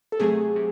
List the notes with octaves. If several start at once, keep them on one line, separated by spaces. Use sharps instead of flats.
A4
C3 F#3 A3 G#4
C3